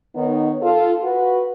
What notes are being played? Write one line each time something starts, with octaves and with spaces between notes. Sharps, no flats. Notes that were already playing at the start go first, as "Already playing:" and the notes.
D#3 B3 D#4 C#5
F4 A4
F#4 B4